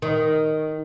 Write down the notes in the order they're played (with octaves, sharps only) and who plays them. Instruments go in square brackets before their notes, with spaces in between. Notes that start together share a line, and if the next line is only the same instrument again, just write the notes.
[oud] D#3